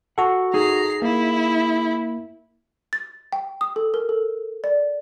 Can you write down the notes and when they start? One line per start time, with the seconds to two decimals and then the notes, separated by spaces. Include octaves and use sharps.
0.18 F#4 A4 F#5
0.54 D#4 G#4 A#5 C7
1.02 A#3 E4
2.93 A6
3.33 G5
3.61 D#6
3.76 A4
3.94 A#4
4.09 A4
4.64 D5